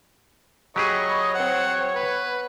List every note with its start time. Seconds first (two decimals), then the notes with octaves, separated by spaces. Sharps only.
0.76 F#3 G4 G#4 C#5 D#5 B5 C#6
1.34 C4 C5 F#5
1.95 B3 B4